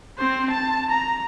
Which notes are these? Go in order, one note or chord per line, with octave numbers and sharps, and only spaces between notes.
C4 C5
A5
A#5